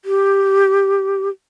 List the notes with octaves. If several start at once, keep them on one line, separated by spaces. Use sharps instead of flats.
G4